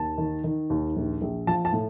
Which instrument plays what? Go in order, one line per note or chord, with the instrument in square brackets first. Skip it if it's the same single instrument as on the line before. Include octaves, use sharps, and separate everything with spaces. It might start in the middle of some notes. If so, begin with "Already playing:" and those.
Already playing: [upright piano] D#2 A5
D#3
D#3
D#2
A#1
A#1
F3 A5
A5
A2